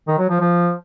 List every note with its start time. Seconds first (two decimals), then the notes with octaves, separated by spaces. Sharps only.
0.07 D#3
0.18 F#3
0.29 F3
0.40 F3